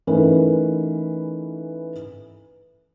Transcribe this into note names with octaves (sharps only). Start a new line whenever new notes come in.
E3 A3 C#4 D#4 A#4 B4